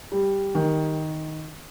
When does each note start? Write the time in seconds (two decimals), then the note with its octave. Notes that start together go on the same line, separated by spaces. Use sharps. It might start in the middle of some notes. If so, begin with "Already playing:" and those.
0.12 G3
0.55 D#3